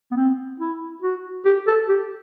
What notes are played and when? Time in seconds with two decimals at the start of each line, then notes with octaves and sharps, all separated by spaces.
0.11 B3
0.16 C4
0.60 E4
1.02 F#4
1.45 G4
1.67 A4
1.89 G4